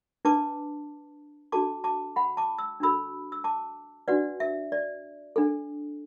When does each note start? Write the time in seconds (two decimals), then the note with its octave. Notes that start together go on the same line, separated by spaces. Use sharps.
0.25 D4 B4 A5 D6
1.52 D4 F#4 A4 A5 D6
1.84 A5 D6
2.16 F#5 B5
2.37 A5 D6
2.58 E6
2.80 D4 F#4 A4 B5 E6
3.32 E6
3.44 A5 D6
4.08 D4 F#4 B4 D5 F#5
4.40 E5
4.72 D5
5.36 D4 A4